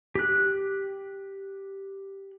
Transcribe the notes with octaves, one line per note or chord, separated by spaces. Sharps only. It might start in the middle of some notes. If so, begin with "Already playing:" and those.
G4 F#6